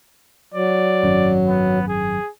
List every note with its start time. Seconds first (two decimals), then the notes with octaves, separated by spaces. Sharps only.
0.54 F#3 D5
1.03 G#1 F#2
1.47 B3
1.88 G#4